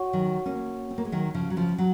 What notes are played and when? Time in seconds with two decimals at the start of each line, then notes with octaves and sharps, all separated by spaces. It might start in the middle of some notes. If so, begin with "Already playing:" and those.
Already playing: F#4 C#5 F#5 C#6
0.13 D#3 F#3
0.46 A#3 C#4
0.91 C4
0.98 A#3
1.05 G#3
1.12 D#3 F#3
1.34 C#3 F3
1.50 F#3
1.57 C#3 F3
1.78 F#3